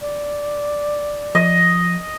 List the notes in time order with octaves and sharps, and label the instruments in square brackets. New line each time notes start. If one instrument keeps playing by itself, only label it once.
[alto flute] D5
[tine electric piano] F3 [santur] D#5